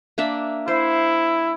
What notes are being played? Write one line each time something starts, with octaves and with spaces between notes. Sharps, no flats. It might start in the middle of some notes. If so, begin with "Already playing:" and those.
A#3 D4 E5
E4 C5